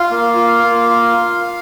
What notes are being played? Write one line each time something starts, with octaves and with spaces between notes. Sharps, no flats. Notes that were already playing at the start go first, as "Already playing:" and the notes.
Already playing: F4 F5
A#3
F4
A#3
F4